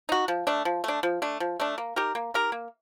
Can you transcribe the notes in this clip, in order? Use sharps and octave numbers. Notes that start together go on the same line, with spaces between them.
D#4 F#4
F3
A3 D4
F3
A3 D4
F3
A3 D4
F3
A3 D4
A#3
D#4 G4 A#4
A#3
D#4 G4 A#4
A#3